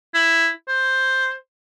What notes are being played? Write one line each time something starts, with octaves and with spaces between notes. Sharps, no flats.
E4
C5